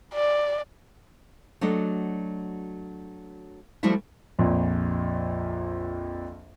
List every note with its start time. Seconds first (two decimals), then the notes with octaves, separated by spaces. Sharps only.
0.14 D5
1.61 F#3 A3 D4 F#4 D#5
3.83 F3 G3 A3 E4 F#4 E5
4.39 A#1 F2 A#2